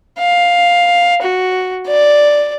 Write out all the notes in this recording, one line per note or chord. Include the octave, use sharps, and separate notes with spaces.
F5
F#4
D5